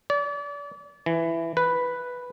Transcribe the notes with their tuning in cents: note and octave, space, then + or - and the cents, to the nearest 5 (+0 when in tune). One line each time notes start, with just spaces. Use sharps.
D5 -35
E3 +10
B4 +0